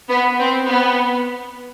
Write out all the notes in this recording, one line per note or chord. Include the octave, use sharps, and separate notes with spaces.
B3
C4
B3